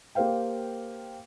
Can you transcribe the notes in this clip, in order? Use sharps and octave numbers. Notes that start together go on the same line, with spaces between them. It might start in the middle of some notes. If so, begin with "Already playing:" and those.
A#3 G4 A#4 C5 F5 G5